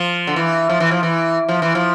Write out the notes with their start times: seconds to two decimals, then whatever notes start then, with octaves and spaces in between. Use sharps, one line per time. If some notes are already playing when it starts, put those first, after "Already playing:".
Already playing: F3
0.27 D3
0.36 E3
0.69 F3
0.80 E3
0.91 F3
1.03 E3
1.49 F3
1.62 E3
1.75 F3